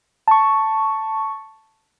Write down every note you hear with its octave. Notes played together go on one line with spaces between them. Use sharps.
A5 C#6